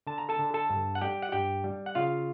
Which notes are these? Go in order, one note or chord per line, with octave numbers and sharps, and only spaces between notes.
D3 A5
A#5
A4 A5
D3
A4 A5
G2
F#5
G3 G4 G5
F#5
G2 G4 G5
G3
F#5
C#3 F4 F5